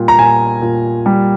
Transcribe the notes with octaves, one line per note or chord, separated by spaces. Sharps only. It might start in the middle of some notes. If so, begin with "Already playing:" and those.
Already playing: A#2 G3
A#5
A#2 G#5
A#2
G3